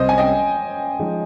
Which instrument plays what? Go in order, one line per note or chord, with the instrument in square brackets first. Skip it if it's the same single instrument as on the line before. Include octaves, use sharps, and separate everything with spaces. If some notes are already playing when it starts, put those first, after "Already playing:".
Already playing: [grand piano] C2 C3 G3 [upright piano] C5 D#5
[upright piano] G#5
D#5 G5
[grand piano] F3 G#3 D#4